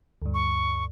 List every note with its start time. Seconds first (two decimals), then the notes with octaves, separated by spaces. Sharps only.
0.22 D2 G2
0.34 C#6